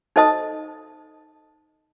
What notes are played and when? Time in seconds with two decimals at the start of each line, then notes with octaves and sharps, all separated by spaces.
0.16 D#4 A4 C5 D#5 A5 D#6